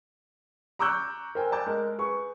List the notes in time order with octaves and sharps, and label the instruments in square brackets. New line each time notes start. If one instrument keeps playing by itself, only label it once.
[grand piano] A#5 C#6 D6 E6 F#6 G6
A#4 C5 G5 G#5
D5 G#5 A5 D6 G6
G#3 A#4
G#4 B4 C#6